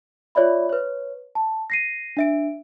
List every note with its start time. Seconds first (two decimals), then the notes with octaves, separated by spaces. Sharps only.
0.35 F4 C#5 D5 E5 B5
0.69 B4 C#5
1.35 A5
1.70 A#6 C7 D#7
2.17 D4 E5 D7